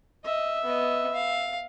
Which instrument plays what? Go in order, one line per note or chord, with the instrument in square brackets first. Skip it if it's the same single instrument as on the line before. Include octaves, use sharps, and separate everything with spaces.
[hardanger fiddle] D#5 [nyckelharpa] E5
[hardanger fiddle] B3 D#5
F5